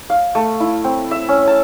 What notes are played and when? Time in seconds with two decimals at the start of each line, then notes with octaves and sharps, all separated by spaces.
0.10 F5
0.35 A3
0.60 E4
0.84 C4
1.11 E5
1.29 C#4
1.48 A5